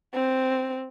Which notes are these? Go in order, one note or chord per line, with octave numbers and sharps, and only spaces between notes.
C4